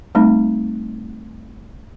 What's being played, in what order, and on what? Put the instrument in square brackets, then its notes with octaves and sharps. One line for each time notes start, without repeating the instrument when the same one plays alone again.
[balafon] G3 A3 C4 D#4